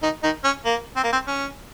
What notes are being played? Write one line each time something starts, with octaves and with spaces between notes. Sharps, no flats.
D#3 D#4
D#3 D#4
C#4
A#3
C4
A#3
C4
C#4